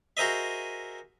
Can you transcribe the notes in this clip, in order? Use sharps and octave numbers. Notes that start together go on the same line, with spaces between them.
F#4 G#4 A#4 C5 D#5 E5